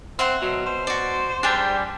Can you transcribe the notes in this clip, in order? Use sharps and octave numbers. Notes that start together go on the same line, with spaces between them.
C4 E5 F#5 C6
B2 F#3
C5
F#4 D5
G3 D4 G4 G#4 G5